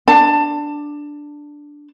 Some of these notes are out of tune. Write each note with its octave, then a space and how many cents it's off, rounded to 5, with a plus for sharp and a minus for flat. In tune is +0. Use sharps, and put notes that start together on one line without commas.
D4 +0 A5 +15